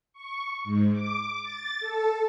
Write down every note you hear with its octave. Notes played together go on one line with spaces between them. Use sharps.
C#6
G#2
D6
A6
A4